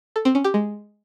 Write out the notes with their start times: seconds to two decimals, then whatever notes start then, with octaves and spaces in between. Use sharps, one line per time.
0.16 A4
0.25 C4
0.35 C#4
0.44 G4
0.54 G#3